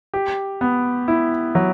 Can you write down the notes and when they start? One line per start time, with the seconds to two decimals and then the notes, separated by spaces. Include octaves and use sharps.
0.14 G4
0.61 B3
1.08 E4
1.55 F#3